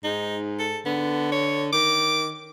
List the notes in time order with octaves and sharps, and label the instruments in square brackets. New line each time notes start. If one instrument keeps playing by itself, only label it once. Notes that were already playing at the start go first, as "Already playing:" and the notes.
[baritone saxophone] G#2 [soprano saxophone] D#4
[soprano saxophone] A4
[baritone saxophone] D3 [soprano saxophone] B3
[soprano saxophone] C#5
[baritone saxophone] D#3 [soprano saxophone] D6